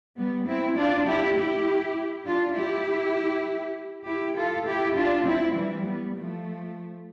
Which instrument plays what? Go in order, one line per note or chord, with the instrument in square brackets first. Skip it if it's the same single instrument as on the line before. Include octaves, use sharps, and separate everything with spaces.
[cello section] G3 B3
C4 E4
D4 F4
E4 G4
E4 G4
D4 F4
E4 G4
E4 G4
F4 A4
E4 G4
D4 F4
C4 E4
E3 G3
G3 B3
F3 A3